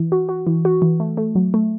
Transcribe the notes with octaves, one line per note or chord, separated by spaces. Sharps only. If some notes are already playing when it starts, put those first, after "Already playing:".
Already playing: E3
F#4
F#4
E3
F#4
E3
A3
A3
F#3
A3